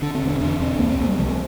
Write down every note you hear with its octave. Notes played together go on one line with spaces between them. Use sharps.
D3 D4
C4
E1
D4
E2 D4
E1 C4
C2 A#3
C4
C2 A#3
G3
C3 F3